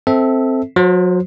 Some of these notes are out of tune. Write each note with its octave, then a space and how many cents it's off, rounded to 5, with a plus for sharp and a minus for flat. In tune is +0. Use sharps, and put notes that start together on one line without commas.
C4 +0 A4 +0 E5 -20
F#3 -30 C5 +0